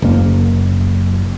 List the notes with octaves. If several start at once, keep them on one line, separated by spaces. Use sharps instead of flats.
F#1 A#3